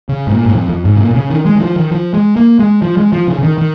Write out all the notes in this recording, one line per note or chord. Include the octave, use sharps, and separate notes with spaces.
C#3
G#2
A#2
G#2
F2
F2
G#2
C#3
A#2
A#2
C#3
D#3
G#3
D#3
F3
D#3
F3
G#3
A#3
G#3
F3
G#3
F3
C#3
C#3
D#3
D#3